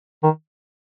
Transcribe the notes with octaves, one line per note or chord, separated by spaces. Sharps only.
D#3